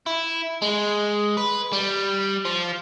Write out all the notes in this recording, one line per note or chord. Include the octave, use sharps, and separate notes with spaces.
E4
G#3
B4
G3
F3